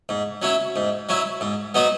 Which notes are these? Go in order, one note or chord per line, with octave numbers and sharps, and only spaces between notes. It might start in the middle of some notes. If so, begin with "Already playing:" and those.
G#2
F#3 C#4 E4
G#2
F#3 C#4 E4
G#2
F#3 B3 D#4 F#4